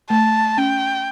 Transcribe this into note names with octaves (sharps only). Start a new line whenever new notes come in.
A3 A5
C#4 G5